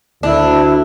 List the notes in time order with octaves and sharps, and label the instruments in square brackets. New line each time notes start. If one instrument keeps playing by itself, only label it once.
[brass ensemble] D2 [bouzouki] D4 [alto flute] E4